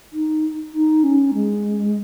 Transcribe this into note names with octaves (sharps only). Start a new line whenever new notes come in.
D#4
D#4
C#4
G#3